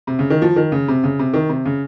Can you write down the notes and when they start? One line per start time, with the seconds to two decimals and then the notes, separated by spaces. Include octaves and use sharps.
0.07 C3
0.19 C#3
0.30 D#3
0.42 F3
0.56 D#3
0.72 C#3
0.88 C3
1.04 C#3
1.19 C3
1.34 D#3
1.49 C3
1.65 C#3